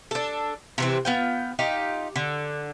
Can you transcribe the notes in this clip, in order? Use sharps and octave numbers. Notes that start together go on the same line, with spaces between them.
D4 A4
C3 E3 C4
B3 F4 G5
D#4 F4 G4
D3